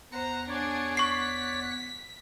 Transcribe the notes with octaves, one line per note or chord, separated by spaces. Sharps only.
E2 C5 F#5 A#5 F#6
D4 G#4 C#5 D5
C#6 B6 C7